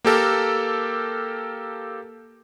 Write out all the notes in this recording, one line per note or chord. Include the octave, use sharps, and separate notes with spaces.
A#3 G4 A4 A#4